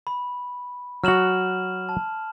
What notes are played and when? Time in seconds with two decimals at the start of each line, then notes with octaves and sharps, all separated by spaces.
0.07 B5
1.04 F#3 F#4 F6 E7 F#7
1.89 A5